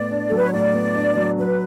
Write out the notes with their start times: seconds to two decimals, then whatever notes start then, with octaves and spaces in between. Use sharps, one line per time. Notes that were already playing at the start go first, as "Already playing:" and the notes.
Already playing: A2 B3 D5
0.11 D4
0.28 A4
0.32 F#3
0.37 B4
0.44 C#5
0.53 A2 D5
0.74 B3
0.95 D4
1.17 F#3
1.38 F#3 B4